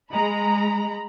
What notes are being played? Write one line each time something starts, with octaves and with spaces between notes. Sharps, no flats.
G#3 A#5 B5